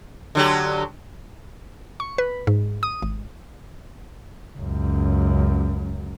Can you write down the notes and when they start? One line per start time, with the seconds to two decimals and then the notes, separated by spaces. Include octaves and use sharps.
0.35 D3 F#3 G4
2.00 C#6
2.18 B4
2.47 G#2
2.83 D#6
3.02 G#1
4.57 C#2 F#2